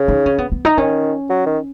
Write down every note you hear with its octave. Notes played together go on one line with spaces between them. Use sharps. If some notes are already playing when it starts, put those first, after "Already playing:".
Already playing: C#3
D#4
C#4
B3
B3
D#4
D#3 C#4
F#3
D#3